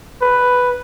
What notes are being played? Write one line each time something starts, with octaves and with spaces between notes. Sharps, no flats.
B4